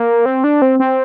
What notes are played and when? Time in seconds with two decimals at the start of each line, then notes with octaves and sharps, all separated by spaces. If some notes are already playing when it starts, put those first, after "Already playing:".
Already playing: A#3
0.26 C4
0.44 D4
0.62 C4
0.79 C4